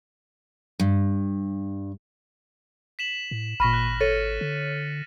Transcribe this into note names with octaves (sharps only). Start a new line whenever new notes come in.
G2
B6 E7 F#7
A2
G#1 A#2 B5 C#6 F6 A#6 B6 D#7
F#6
A4 C#5 A6 C#7 D#7
D3